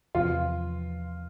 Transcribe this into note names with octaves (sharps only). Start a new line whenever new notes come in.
E2 C3 F3 F4